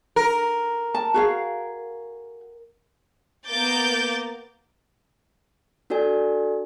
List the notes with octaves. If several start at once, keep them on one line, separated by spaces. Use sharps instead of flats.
A#4
A5
F#4 G#4 F5
A#3 B3 A#4 D6 G6 A6
D4 F#4 A4 D5 G#5